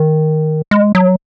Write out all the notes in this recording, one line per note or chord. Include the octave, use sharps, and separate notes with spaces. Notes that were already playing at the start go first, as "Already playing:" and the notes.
Already playing: D#3
G#3
F#3